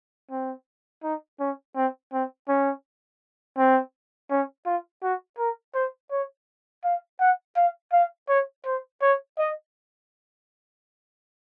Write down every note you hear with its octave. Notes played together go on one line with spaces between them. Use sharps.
C4
D#4
C#4
C4
C4
C#4
C4
C#4
F4
F#4
A#4
C5
C#5
F5
F#5
F5
F5
C#5
C5
C#5
D#5